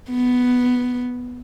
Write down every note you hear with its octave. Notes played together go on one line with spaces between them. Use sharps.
B3